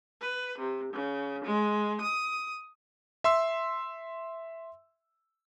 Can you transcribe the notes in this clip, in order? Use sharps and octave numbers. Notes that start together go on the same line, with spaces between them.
B4
C3
C#3
G#3
D#6
E5 C6 E6